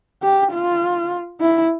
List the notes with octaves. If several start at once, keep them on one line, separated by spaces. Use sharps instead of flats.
G4
F4
E4